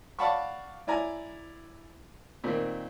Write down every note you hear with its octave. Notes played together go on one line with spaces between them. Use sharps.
D5 F5 F#5 A5 B5 C#6
E4 D5 G#5 A#5
A#2 D#3 C4